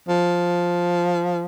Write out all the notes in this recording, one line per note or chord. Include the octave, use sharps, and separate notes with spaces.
F3